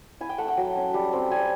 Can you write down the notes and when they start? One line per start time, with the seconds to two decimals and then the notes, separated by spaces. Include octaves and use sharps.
0.21 E4 G#5
0.29 G5
0.38 A3 F#5
0.48 G5
0.57 F#3
0.76 C#4
0.94 G3
1.13 C4
1.31 G3 G#5